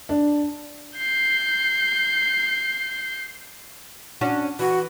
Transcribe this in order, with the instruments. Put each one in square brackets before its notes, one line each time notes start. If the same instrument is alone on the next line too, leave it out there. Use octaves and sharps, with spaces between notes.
[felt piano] D4
[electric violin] G6 C7
[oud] C#4 D4 F#4
[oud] E3 [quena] F#4